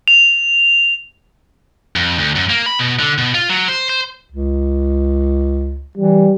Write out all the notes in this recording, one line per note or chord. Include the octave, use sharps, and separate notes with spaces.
F7
F2
D2
F#2
A#3
B5
B2
D3
B2
F4
F#3
C5
C5
C#2
E3 G3